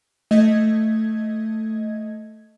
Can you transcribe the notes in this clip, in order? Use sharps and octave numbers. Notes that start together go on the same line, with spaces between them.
A3 D#5 G#6